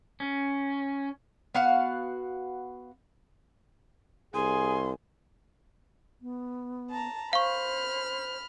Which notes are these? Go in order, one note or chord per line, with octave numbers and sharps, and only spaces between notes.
C#4
B3 F#4 F5 F#5
C2 G#4 G#5 C6
B3
A5 A#5
C5 F5 B5 C#6 F6